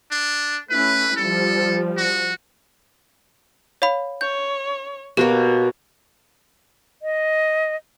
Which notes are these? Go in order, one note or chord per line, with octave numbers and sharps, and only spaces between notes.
D4
A3 C#4 E4 B4
F3 G3 A4
F#4
C#5 F5 B5
C#5 G6
B2 A#3 F#4 G4 C#5
D#5